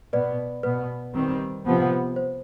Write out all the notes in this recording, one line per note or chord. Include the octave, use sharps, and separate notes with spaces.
B2 B3 B4 D5
B2 B3 B4
D#3 G3 C4
C3 F3 B3
C5